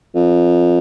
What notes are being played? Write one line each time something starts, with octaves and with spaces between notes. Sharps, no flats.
F2